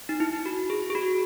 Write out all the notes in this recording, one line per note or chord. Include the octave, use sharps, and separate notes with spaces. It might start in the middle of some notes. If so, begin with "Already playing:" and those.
D#4
E4
F#4
G#4
G#4
F#4